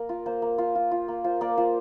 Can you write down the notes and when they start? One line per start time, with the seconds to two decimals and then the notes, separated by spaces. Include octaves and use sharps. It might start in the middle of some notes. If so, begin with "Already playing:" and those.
Already playing: A#3 A#4
0.09 F4
0.26 A#3 C5
0.42 A#3
0.58 F4
0.75 F4
0.91 F4
1.08 A#3
1.24 F4 C5
1.41 A#3 D5
1.57 F4 C5